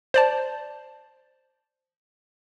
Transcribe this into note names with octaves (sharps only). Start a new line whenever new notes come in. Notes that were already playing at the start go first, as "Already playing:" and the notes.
C5 D5 A5